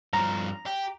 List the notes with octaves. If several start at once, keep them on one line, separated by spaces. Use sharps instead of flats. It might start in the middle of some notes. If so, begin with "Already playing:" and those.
G2 F3 A#5
G4